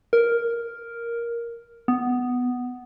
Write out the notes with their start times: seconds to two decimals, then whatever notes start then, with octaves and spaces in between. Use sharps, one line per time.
0.13 A#4
1.88 B3